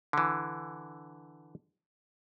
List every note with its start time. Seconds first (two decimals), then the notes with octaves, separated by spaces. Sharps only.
0.13 D3 E3